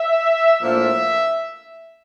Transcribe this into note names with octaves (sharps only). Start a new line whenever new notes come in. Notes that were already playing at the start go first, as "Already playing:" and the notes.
Already playing: E5
A2 F3 A#3 D4 F4 E5